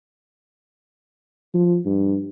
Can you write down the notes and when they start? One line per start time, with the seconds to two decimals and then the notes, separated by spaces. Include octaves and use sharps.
1.54 F3
1.85 G2